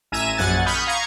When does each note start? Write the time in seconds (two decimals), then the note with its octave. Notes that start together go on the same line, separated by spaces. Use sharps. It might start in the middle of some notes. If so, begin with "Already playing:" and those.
0.12 A1 E5 G#5 A#5 D#7 E7
0.37 A#1 F#2 F#5 G#5 A6
0.65 B5 C#6 D#6 F6 G6
0.87 F5 A#5 C#6 G#6